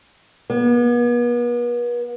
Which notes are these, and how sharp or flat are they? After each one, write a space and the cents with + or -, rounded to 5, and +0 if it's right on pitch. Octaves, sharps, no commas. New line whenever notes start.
B3 -40